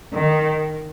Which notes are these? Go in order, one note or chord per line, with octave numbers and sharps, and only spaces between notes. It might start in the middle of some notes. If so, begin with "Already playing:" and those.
D#3